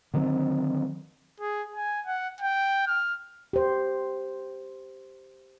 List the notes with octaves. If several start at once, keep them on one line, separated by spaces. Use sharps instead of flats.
D3 D#3 F#3 C4
G#4
G#5
F#5
G5
F6
G4 C5